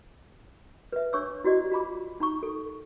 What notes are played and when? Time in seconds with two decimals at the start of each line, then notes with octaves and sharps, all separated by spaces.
0.93 B4 E5
1.13 D4 C#5 C#6 D6 E6
1.44 E4 F#4 G4 D5 D#5
1.72 F4 A#5 B5 D6
2.20 D#4 A#5 C#6
2.43 A4